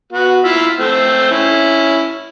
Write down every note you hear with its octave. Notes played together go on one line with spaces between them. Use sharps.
B3 F#4
E4 F4 E5
A3 C4
C#4 E4